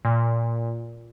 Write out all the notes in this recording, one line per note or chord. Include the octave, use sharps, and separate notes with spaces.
A#2